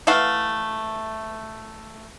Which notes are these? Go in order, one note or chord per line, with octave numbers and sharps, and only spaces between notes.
E3 A3 F5 F#5